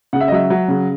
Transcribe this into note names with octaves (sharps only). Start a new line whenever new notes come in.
C#3 F#5
E5
D#5
F#3 E5
F#3
C#3